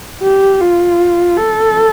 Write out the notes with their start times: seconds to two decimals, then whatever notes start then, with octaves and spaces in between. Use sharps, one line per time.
0.23 G4
0.60 F4
1.36 A4